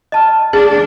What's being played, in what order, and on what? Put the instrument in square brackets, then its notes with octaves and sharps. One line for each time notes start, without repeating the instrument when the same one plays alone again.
[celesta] D#5 A5 F6
[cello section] D4 [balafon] G#4 [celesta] A6